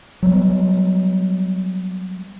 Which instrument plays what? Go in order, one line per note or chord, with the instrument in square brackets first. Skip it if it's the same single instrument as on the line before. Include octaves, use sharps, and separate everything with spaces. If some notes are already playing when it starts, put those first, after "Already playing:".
[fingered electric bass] F#3 G3 B3